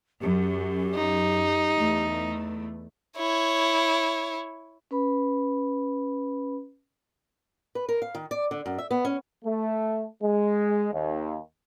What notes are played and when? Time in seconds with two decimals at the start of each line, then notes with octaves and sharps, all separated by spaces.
0.22 F#2 G4
0.94 D#4
1.76 E2 A3
3.17 E4 C#5
4.91 C#4 B4 B5
7.75 B4
7.89 A#4
8.02 F5
8.15 D#3
8.31 D5
8.51 D3
8.66 F#2
8.78 E5
8.91 B3
9.05 C#4
9.44 A3
10.23 G#3
10.93 D#2